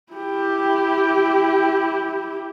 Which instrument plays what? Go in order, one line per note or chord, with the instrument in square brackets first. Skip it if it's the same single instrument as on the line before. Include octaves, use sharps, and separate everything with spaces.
[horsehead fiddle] E4 G4